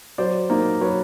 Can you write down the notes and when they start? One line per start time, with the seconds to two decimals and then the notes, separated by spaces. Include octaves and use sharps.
0.18 F#3 C5 D5
0.50 A#3 D#4
0.81 F#3 B4 C#5